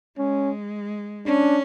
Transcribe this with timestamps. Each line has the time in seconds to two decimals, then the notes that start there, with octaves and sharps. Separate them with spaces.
0.18 G#3 C#4
1.26 C#4 D4